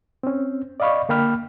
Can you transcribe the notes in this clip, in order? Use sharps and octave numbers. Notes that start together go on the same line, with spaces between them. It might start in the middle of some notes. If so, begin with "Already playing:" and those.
C4 C#4
D5 D#5 F5 B5 C#6
D3 A#3 G5 B5 F6